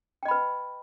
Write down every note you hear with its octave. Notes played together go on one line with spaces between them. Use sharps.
B4 D#5 G5 B5